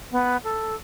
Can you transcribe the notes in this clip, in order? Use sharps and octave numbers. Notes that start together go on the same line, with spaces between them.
B3
A4